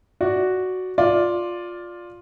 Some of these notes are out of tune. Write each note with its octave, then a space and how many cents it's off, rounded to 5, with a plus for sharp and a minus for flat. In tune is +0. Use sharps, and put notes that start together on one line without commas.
F#4 +0 D5 +0
F4 +10 D5 +0